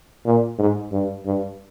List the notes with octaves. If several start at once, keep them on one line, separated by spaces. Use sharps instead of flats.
A#2
G#2
G2
G2